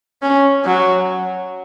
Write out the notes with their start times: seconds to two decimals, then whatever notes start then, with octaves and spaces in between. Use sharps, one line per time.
0.22 C#4
0.65 F#3